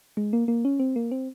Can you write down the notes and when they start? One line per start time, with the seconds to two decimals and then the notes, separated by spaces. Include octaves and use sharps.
0.17 G#3
0.33 A#3
0.48 A#3
0.65 C#4
0.80 C4
0.96 A#3
1.12 C4